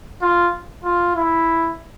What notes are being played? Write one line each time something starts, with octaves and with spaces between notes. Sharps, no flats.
F4
F4
E4